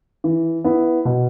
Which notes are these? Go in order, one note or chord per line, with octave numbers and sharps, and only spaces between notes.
E3
B3 E4
B2